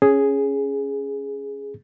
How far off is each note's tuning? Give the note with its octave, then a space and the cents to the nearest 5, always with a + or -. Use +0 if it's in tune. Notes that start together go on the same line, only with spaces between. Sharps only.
C#4 +0 G#4 +0